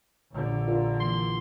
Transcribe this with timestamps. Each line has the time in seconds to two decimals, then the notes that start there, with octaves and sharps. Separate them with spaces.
0.32 A#1 D3
0.68 F4 A#4 D5
1.00 E3 A#3 C6